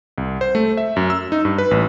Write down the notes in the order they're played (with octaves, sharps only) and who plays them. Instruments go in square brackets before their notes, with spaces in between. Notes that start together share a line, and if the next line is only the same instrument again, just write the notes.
[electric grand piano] C2
C5
A3
E5
F#2
E6
D#4
G2
B4
A1